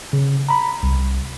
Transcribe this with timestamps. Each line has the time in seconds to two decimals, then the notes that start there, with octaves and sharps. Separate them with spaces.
0.13 C#3
0.49 A#5 B5
0.83 C2